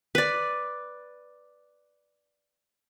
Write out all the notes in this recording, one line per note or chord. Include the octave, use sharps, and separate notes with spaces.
B4 D5